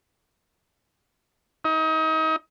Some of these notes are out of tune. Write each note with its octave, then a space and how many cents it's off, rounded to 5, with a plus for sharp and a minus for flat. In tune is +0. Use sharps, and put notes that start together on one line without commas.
D#4 +30